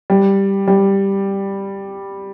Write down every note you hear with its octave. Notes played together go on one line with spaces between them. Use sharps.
G3
G3